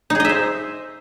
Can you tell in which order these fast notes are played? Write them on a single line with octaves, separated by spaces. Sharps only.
D#4 G#4 D#5 E5 C5